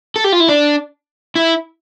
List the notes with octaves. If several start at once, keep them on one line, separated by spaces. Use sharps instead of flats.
A4
G4
F4
E4
D4
E4